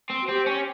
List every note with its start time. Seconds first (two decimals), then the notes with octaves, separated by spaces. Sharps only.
0.10 C4
0.22 F#4
0.28 C4 G4
0.46 C#4